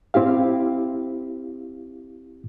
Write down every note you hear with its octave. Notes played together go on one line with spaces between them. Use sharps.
C4 E4 G4 F5